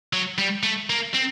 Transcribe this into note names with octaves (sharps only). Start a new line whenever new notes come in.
F#3
G3
A3
A#3
C4